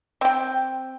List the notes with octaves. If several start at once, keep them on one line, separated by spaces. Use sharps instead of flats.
C4 G5